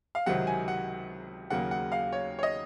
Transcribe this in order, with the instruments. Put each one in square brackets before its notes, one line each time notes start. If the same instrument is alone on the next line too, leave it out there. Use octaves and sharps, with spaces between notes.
[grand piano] F5
C#2 C3 D#3 F#3 F#5
G#5
F#5
D#2 C#3 F#3 A#3 F#5
F#5
F5
C#5
C#5
D#5